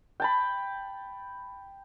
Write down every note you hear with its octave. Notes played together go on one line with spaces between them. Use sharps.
G5 A5 B5